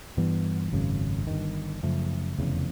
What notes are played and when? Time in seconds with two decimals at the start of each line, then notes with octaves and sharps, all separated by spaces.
0.17 G2 E3 G3 B3
0.73 G#1 F#2 C#3
1.27 G1 G2 D#3
1.83 F#2 C#3 F3 A3
2.39 F1 E2 C#3